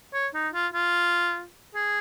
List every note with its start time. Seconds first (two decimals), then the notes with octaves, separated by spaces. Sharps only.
0.13 C#5
0.34 D#4
0.53 F4
0.74 F4
1.75 G#4